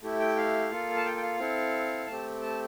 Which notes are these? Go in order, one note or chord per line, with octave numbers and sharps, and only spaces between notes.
A3 E4 G4
G5
F5
A#3 F4 A4
A5
G5
G5
F5
C4 E4 A4
A3 C4 G4 A5
A5